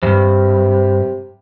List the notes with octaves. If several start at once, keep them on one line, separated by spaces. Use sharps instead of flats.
E2 G2 C3